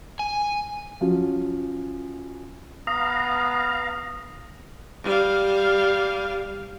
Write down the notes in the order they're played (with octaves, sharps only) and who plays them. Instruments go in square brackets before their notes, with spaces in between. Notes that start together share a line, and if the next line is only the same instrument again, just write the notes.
[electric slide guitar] G#5
[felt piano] F3 F#3 C#4
[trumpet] B3 [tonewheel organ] F5 A#5 [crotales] D#6
[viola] G3 F5